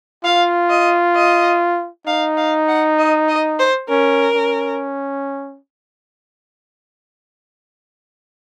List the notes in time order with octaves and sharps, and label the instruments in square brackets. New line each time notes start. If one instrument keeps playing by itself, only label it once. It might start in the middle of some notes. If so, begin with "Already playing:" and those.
[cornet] F4 [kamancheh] F5
[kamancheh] D#5
D#5
[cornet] D#4 [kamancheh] F5
[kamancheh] F5
F#5
D#5
D#5
C5
[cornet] C#4 [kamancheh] A#4
[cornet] C#4